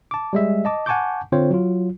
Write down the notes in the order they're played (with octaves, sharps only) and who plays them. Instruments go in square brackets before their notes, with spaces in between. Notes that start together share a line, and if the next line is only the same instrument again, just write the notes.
[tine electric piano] A5 D6
G3 G#3 E5
D#5 A5 D6
F#5 G#5 A5 C#6 D6 G6
D3 C4 F4 C5 C#5
F#3 F4